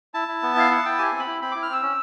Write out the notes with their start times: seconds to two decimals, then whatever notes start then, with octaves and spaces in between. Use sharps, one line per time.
0.14 E4 A5
0.28 E4
0.43 B3
0.56 E4 F5
0.71 E4 F#5
0.84 E4 G5
0.99 G4 G#5
1.13 C4
1.19 B5
1.27 E4
1.41 C4 B5
1.52 E4 D6
1.63 F6
1.69 C4 E6
1.83 C#4